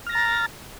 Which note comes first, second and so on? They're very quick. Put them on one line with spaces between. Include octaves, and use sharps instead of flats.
F6 A#6 A6 A#5